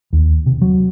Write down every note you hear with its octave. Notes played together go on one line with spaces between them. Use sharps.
D#2
C3
F#3